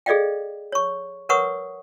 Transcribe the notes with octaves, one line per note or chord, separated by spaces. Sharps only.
G#4 A4 D5 D#5 F5 G5
C#5 C#6
A#4 B4 C#5 F#5 C#6 D#6